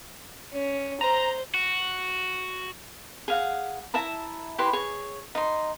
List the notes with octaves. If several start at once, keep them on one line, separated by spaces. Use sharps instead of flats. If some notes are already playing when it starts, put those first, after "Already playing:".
C#4
C5 A#5
F#4
G#4 F5 F#5
E4 E5 A5 A#5
E4 G4 B4 C6
G#4 C#5
D#4 C6